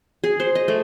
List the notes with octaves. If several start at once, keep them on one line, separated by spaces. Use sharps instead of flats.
G#4
C5
D#5
A3